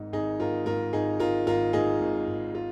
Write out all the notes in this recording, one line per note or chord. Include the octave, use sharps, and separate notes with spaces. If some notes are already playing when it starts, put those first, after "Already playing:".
Already playing: G#1 G#2 D#3 D#4
G#1 D#4 G#4
G#1 F4 A#4
G#2 F4 A#4
G#1 D#4 G#4
G#1 F4 A#4
G#1 F4 A#4
G#2 D#4 G#4
G#1
G#1
F4